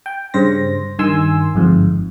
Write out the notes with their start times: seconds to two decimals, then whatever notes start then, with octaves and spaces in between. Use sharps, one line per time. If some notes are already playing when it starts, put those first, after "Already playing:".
0.06 G5
0.34 G2 C#3 C5 A#6
0.99 G2 D#3 G#5 C6 E6
1.54 G1 F2 G#2